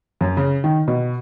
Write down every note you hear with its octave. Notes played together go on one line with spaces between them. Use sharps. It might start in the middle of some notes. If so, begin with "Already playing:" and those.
F#2
C#3
D#3
B2